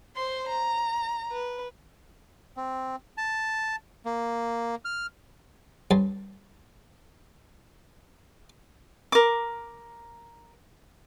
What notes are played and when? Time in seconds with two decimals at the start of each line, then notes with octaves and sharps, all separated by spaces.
0.16 C5 C6
0.49 A#5
1.32 B4
2.57 C4
3.17 A5
4.06 A#3
4.85 F6
5.91 G2 C#4 A5 C6
9.12 A#4 D6